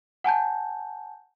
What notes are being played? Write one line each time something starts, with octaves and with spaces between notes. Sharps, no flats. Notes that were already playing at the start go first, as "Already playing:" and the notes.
F#5 G#5 A5 G6